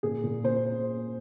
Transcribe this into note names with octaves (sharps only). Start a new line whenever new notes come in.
A#2 G#4
A#2
A#2 C5